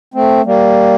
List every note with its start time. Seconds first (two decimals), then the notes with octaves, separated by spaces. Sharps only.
0.14 A3 C4
0.45 G3 A#3